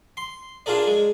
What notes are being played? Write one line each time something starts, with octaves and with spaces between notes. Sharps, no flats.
C6
D4 F4 G#4 A#4 D5
G#3